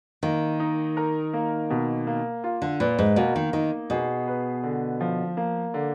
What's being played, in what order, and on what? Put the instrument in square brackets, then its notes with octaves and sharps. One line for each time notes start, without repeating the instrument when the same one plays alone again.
[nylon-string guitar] D#3 [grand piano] A#3
[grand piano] D#4
A#4
A#3
B2
A#3
F4
[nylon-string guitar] D3
[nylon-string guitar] A#2 [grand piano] B4
[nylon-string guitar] G#2
[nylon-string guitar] B2 [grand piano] A#3
[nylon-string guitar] D#3
[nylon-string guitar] D#3 [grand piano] D#4
[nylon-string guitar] B2 [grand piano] G#4
[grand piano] B4
D3
F3
A#3
D3